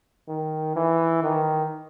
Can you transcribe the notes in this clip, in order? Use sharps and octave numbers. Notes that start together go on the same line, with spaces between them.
D#3
E3
D#3